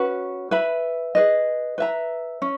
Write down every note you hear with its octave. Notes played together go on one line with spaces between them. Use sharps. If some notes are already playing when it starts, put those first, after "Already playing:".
Already playing: C#4 F#4 B4
B4 E5 B5
G#4 B4 D#5
B4 E5 A#5
C#4